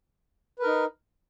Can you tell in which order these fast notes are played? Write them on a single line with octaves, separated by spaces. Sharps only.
B4 A#4 D#4